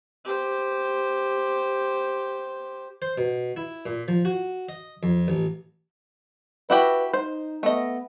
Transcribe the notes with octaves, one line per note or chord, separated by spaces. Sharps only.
G4 C5
C5
B2
E4
A#2
F3
F#4
D#5
F2
A1
E4 F#4 G4 B4
D#4 C5
A3 B3 D#5